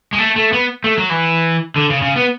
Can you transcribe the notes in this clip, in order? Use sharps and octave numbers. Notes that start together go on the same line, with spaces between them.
G#3
A3
A3
B3
A3
F#3
E3
D3
C#3
C#3
B3